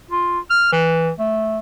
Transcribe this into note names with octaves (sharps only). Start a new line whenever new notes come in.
F4
F6
E3
A3